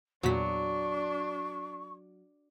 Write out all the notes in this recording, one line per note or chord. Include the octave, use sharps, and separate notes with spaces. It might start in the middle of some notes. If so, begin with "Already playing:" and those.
E2 A#2 F#3 D4 C#6 B6